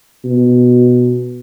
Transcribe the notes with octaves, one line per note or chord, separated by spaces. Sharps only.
B2